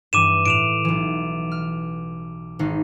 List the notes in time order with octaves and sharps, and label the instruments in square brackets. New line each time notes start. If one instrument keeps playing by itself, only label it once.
[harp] G2 E3 [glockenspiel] D6 D#7 E7
[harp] A2 [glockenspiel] D7 E7 F7
[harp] B1 E3
F6
G#1 D#4 C7